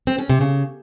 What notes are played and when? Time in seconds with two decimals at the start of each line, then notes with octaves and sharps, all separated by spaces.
0.07 C4
0.18 C#4
0.30 C3
0.41 C#3